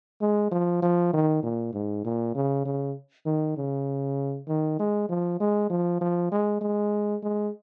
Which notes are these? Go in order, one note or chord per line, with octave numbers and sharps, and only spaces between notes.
G#3
F3
F3
D#3
A#2
G#2
A#2
C#3
C#3
D#3
C#3
D#3
G#3
F3
G#3
F3
F3
G#3
G#3
G#3